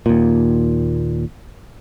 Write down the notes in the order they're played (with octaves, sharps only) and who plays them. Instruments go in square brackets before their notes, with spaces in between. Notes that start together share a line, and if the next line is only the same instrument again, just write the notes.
[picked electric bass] D#2 A#2